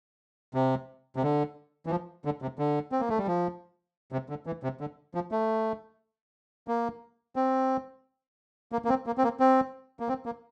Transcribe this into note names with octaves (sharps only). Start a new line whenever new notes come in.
C3
C3
D3
E3
F3
D3
C3
D3
C4
A#3
A3
G3
F3
C3
D3
E3
C3
D3
F3
A3
A#3
C4
A#3
A#3
C4
A#3
C4
A#3
C4
A#3
C4
A#3